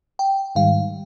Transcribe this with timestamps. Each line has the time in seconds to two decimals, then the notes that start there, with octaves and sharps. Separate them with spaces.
0.19 G5
0.55 G#2 D#3 G3 F5